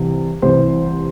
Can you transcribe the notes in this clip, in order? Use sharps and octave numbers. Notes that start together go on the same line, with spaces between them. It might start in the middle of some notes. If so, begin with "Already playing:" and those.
Already playing: C2 C3 E3
C2 C3 E3 C5